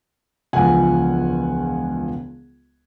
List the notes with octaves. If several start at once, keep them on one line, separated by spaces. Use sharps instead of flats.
E1 C#2 F3 F#5 G#5